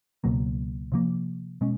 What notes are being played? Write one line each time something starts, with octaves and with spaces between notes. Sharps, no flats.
C#2 B2 F#3 A#3
C3 F3 A#3
B2 G#3 C#4